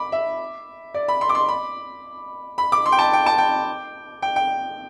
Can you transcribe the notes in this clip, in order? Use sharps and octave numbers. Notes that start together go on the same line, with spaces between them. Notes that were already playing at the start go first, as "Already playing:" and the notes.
Already playing: B5 D6
E5
D5
B5
C6
D6
C6
B5
B5
D6
C6
G5
A5
G5
A5
G5
G5
G5